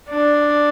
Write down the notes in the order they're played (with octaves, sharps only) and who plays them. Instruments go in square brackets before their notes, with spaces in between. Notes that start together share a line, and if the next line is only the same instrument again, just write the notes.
[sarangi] D4